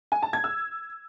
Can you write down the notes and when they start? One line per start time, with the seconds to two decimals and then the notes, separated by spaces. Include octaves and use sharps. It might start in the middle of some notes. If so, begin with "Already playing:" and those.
0.12 G#5
0.22 A5
0.33 G#6
0.44 E6